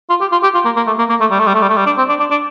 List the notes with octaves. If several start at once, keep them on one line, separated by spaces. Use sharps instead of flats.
F4
G4
F4
G4
F4
A#3
A#3
A3
A#3
A#3
A3
G3
A3
G3
A3
G3
A3
G3
D4
C4
D4
D4
D4